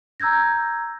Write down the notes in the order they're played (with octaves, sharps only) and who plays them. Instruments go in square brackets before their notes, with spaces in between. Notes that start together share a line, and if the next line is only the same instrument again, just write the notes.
[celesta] A#5 E6 G6 G#6 A#6